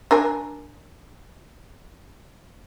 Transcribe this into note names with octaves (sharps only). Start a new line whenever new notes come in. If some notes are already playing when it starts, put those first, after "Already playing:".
D4 A#4 G#5